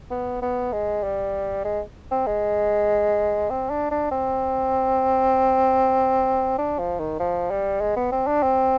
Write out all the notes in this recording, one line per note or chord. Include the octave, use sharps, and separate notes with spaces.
B3
B3
G#3
G3
G#3
C4
G#3
C4
D4
D4
C4
D4
F3
D#3
F3
G3
G#3
B3
C4
D4
C4